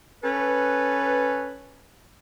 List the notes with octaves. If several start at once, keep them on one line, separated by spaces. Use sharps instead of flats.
C#4 A4 B4